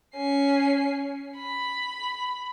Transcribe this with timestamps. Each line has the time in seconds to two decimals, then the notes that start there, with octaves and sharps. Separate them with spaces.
0.16 C#4 C7
1.37 B5